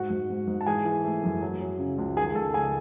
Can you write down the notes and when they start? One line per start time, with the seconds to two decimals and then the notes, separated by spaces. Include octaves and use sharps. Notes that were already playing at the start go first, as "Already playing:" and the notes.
Already playing: G#2 F#4 F#5
0.10 G#2
0.30 G#2
0.47 G#2
0.61 A5
0.66 E3 G#4 G#5
0.85 E3
1.04 A3
1.23 F#2
1.41 F#3
1.61 F#3
1.79 C#3
1.98 C#2
2.16 D#3 G#4 G#5
2.35 C#2 A4 A5
2.54 C#2 G#4 G#5